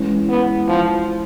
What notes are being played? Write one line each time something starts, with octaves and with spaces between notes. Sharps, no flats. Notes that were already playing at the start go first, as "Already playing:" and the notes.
Already playing: E3 G#3 C#4
B3
F3